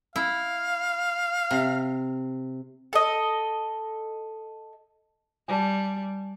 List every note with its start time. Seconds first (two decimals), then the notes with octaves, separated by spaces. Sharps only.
0.16 E4 F5
1.51 C3
2.93 A4 D#5
5.48 G3 G#5 A5